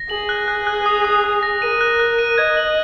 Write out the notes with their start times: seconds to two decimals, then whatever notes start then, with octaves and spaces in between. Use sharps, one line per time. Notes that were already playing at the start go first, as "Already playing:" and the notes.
Already playing: A#6
0.10 G#4 F#7
0.29 F#6
0.48 F#6
0.67 F#6
0.86 D#6
1.05 D#6
1.24 D#6
1.43 A#6
1.61 A#4 D#7
1.81 F#6
2.00 F#6
2.19 D#7
2.38 D#5 G#6
2.57 F#7